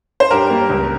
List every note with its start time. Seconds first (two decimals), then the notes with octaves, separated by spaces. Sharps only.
0.20 C5
0.31 G2 G4 A#4
0.50 G3 A#3
0.69 C#2